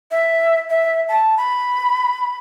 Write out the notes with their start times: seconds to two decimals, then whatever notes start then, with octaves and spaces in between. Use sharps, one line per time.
0.11 E5
0.70 E5
1.09 A5
1.37 B5